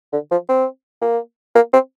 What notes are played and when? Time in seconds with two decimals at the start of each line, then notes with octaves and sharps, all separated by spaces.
0.13 D3
0.31 F3
0.49 C4
1.02 A#3
1.55 A#3
1.73 C4